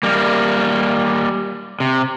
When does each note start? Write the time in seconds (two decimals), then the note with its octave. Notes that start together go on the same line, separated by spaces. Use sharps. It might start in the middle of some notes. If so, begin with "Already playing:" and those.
0.03 G3 A#3
1.80 C3